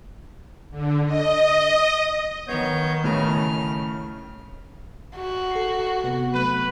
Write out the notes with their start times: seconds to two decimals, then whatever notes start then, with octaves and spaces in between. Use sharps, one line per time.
0.71 D3
1.06 D#5
2.48 D#3 B3 C#5 G6
3.04 A2 C#3 F6
5.17 F#4
5.51 A4 C7
6.04 C3 B3 B4
6.34 F#3 A3 B4